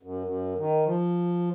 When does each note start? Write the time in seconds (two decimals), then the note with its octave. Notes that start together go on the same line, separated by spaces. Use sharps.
0.03 F#2
0.24 F#2
0.58 D#3
0.86 F3